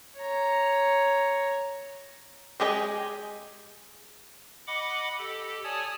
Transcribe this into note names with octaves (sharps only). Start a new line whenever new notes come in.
C#5 A#5
G#3 G4 G#4 B4 D#5
D#5 F#5 B5 D6
G4 A4
C#5 D5 G#5 A5 D#6